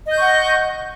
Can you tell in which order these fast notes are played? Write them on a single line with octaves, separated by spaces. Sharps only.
D#5 G6 C#6 F#5